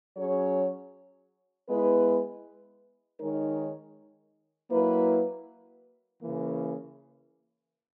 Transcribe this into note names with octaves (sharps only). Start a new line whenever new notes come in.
F#3 C#4 G#4 C#5
G#3 B3 E4 B4
D#3 G#3 D#4 A#4 C#5
F#3 A#3 E4 B4
C#3 E3 A#3